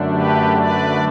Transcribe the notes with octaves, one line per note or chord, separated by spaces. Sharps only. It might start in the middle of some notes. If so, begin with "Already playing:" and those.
Already playing: F#2 D3 A3 D4
G4 B4
B4 D5